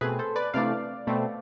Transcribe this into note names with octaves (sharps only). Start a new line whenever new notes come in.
B2 A3 C4 G#4 B4
A4 C5
B4 D5
C3 E3 A3 D4 D5 F5
B2 A3 C4